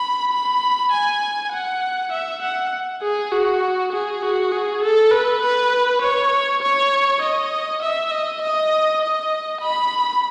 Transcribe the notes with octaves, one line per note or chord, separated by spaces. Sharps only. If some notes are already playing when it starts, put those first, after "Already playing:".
Already playing: B5
B5
G#5
F#5
E5
F#5
G#4
F#4
G#4
F#4
G#4
A4
B4
B4
C#5
C#5
D#5
E5
D#5
D#5
D#5
B5